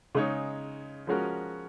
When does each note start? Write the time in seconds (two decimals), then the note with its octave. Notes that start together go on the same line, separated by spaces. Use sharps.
0.15 C#3 G#3 D#4 G#4 C#5
1.07 F3 G#3 C#4 F#4 A#4